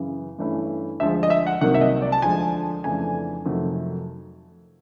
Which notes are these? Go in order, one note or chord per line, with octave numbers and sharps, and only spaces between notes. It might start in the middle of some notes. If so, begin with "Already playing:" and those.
Already playing: F#2 C#3 E3
G2 E3 A3 C#4 E4
D2 D3 F3 G#3 E5
D#5
E5
F#5
C2 C3 D#3 F#3 A#3 F#5
E5
D#5
D5
A5
D2 D3 F3 G#3 G#5
F2 C#3 E3 A3 D4 G#5
F2 C3 D#3 F#3 A3